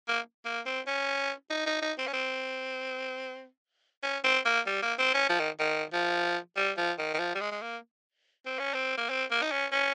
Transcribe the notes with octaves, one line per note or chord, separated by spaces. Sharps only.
A#3
A#3
C4
C#4
D#4
D#4
D#4
C4
C#4
C4
C#4
C4
A#3
G3
A#3
C4
C#4
F3
D#3
D#3
F3
G3
F3
D#3
D#3
F3
G3
G#3
G#3
A#3
C4
C#4
C4
A#3
C4
A#3
D#4
C#4
C#4